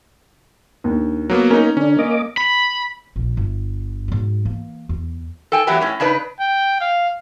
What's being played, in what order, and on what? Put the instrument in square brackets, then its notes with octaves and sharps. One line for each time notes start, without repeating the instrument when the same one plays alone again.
[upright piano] D#2 D4
[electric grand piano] F#3 A#3 B3
[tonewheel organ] A#3 [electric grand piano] C#4 D#4 [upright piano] A#4
[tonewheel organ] D3 D4 [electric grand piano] C#4
[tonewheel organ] A#3 D#5 D6
[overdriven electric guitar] B5
[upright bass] A#1
G1
G#2 F#3
E3 A#3
E2
[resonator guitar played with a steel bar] A4 G5 G#5
E3 F#3 A3 B3 G4 A#4
A2 C#4
C#3 D4 D#4 B4
[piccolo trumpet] G5
F5